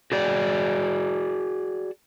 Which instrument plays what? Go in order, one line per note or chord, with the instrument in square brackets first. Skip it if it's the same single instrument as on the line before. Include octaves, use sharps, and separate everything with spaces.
[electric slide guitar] F#4 G#4 D5